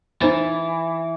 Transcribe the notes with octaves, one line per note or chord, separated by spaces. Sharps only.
E3 D#4 C5 A6